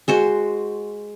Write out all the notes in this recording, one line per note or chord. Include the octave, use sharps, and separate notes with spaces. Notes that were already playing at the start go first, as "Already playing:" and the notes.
G#3 F#4 C5